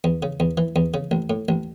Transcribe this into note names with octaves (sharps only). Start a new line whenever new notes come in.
E2
C#3
E2
E3
E2
C#3
A1
A2
A1